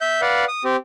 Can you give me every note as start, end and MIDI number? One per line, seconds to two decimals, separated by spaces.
0.01 0.21 76
0.01 0.21 91
0.22 0.45 71
0.22 0.45 74
0.22 0.45 77
0.22 0.45 78
0.48 0.63 87
0.64 0.76 60
0.64 0.76 67